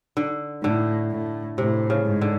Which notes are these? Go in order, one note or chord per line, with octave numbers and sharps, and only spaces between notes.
D3
A2 D3
A2
A2 C3
C#3
G#2
D3